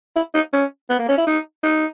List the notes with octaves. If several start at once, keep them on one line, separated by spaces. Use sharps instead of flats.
E4
D#4
C#4
B3
A#3
C#4
E4
D#4
D#4